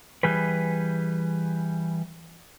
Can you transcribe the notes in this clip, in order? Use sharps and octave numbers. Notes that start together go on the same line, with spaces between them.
E3 G3 G#4 B4